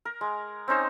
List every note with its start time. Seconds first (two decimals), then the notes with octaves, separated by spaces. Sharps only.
0.05 A#4
0.21 G#3
0.68 C4 C#4 D#4 C5